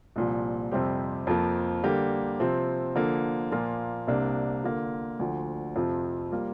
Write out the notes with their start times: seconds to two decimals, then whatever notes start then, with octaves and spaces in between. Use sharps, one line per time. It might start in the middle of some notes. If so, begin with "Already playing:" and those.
0.16 C2 A#2 F3
0.72 F2 C3 G3 C4 G4
1.27 F2 F3 A#3
1.84 D3 G3 A#3 G4
2.40 C3 F3 C4
2.96 D3 F3 A#3
3.51 A#2 F3 A#3 F4
4.07 C2 C3 A#3 D4
4.64 D3 A#3 F4
5.19 D2 D3 F3
5.76 F2 C3 F3 C4
6.32 G3 A#3 F4